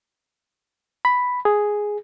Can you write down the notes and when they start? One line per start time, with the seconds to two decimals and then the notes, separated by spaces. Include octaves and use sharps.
1.05 B5
1.45 G#4